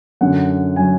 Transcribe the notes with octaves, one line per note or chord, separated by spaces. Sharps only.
F#2 D3 F#3 F#5
D3 F#3 G#5